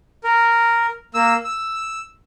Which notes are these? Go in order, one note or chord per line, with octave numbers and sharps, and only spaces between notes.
A#4
A#3 E6
E6